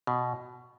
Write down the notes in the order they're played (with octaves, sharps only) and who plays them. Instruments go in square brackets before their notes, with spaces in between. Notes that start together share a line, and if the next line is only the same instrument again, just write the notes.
[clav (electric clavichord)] B2